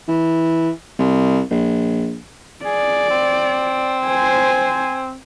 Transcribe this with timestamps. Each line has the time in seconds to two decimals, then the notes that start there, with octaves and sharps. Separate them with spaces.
0.08 E3
0.99 C2
1.51 A#1
2.65 G#4 D5
3.10 C4
4.07 C5 G#5